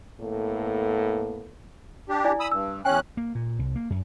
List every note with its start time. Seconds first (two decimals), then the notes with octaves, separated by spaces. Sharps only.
0.20 A2 A#3 B3 A4
2.09 D4 G4
2.24 E4 D5 G#5
2.40 B5 D#6 E6
2.51 G2 E6
2.85 E2 C#4 C#5 G5 G#5 F#6
3.17 A#3
3.35 A#2
3.59 C2
3.76 A#3
3.90 F#2